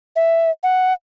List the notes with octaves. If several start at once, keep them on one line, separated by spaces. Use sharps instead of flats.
E5
F#5